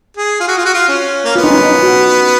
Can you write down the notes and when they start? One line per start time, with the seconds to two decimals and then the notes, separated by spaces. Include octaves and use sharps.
0.17 G#4
0.40 F4
0.48 F#4
0.58 F4
0.66 F#4
0.74 F4
0.88 C#4
1.25 A#3
1.36 B3 F4
1.44 D#4
1.50 C#4
1.59 D#4
1.83 F#4